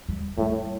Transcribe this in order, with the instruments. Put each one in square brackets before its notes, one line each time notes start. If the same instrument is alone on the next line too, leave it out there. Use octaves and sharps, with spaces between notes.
[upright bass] G3
[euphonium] A2 [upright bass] G3